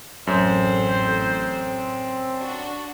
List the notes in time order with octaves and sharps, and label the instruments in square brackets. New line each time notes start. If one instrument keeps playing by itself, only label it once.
[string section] A1 [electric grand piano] F#2 [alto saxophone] C4 [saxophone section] C5
[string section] D4 F#4